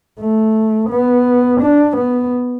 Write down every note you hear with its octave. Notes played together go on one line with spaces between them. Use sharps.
A3
B3
D4
B3